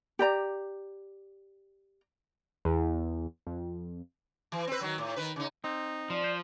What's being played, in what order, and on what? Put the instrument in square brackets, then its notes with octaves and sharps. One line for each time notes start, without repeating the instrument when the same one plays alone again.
[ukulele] G4 D5 A#5
[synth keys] E2
F2
[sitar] E3
C4 B4
D#3 F#3
A2
D#3 B4
C#3 D#4
[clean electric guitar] C4 [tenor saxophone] D#4
[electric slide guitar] F3 [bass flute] D5
[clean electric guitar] C5